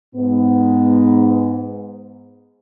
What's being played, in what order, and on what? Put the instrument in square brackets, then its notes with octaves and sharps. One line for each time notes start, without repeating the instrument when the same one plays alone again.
[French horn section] G#2 B3